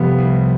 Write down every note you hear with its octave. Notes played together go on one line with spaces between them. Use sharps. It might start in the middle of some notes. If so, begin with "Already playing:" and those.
Already playing: C3 F3 G3 B3
C2